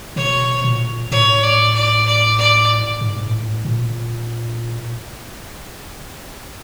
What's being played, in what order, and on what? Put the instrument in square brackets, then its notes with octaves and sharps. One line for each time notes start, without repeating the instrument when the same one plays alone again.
[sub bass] B2 [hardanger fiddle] C#5
[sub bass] A#2
[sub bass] A2 [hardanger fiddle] C#5
[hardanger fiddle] D5
D5
D5
D5
[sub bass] G#2
A#2
A2
A#2